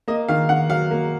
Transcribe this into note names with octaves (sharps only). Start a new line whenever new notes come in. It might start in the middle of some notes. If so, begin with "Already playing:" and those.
A#3 D#5
D#3 F5
D#3 F#5
F#3 F5
A#3